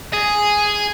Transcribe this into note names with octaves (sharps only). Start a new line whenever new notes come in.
G#4